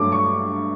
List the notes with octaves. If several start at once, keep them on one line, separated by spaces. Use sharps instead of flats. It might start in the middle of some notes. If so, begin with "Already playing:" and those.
Already playing: G2 F#3 A3 D6
C#6